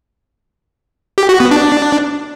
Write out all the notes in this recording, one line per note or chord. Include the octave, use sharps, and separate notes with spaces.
G4
F#4
B3
D4